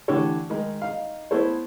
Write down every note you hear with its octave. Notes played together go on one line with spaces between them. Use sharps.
D3 E3 A3 G4 A4 C#5
D#3 G#3 D#4
D#4 F5
B3 E4 A4 C5 C#5